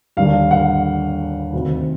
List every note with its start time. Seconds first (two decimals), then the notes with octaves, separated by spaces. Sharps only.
0.17 D#2 D3 G3 A#3 D4 F5
0.51 F#5
1.53 D2 C3 D#3